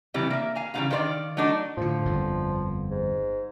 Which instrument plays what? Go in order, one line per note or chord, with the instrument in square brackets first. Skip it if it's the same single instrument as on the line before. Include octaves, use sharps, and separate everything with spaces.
[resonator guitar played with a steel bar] C3 E3 G3 C4
A#3 E5
F5 G#5 A#5
C#3 E3 G3 B3 F5 A#5
D#3 G4 C5 D5 F5
F#3 A3 D4 D#4 D5
[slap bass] A2 D3 [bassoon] F3
[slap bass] G1 F2
[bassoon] G#2